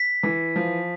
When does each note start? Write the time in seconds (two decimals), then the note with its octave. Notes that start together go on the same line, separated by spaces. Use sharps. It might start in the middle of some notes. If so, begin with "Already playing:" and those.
Already playing: B6
0.23 E3
0.56 F3